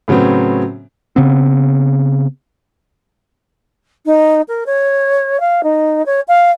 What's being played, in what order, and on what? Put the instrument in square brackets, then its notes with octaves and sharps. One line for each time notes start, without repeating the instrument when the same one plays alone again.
[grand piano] A2 C#3 F#3 B3 C4
[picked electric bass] C#3 B3 C4
[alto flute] D#4
A#4
C#5
F5
D#4
C#5
F5